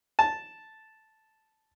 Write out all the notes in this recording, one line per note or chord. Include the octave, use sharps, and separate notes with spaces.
A5